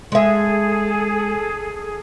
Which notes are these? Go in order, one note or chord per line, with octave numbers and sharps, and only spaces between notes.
G#3 G#4 A4 E5